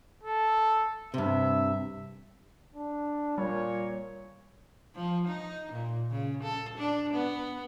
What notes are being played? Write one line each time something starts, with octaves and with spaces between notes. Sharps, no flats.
A4
G2 C3 E5
D4
A#2 G3 C#5
F3
D#4
A#2
C#3
A4
D4
B3